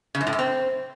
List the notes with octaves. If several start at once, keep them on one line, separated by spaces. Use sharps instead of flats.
C#3
F#2
A2
F#2
C4